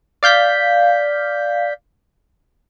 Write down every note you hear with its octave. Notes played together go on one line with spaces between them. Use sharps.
D5 F5 G6 B6